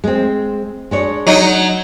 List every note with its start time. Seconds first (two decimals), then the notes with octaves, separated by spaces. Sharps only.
0.04 G#3 C4
0.91 G#3 D4 C#5
1.27 F#3 D#4